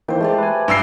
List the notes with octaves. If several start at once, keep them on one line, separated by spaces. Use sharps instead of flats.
E3 A#3 D#4 C5 G5
G#3 A3 G4 D5
B4 G#5
G2 E6 C7